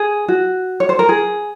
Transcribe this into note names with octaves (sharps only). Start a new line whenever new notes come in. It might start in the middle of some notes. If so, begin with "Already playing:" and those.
Already playing: G#4
F#4
C#5
C5
A#4
G#4